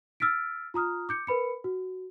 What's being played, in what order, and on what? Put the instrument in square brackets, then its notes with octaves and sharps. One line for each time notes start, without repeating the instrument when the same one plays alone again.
[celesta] E6 F6 A6 B6 D7
F4 A#5 D#6 F6
D6 G6 C#7
A#4 B4 B5 C#7
F#4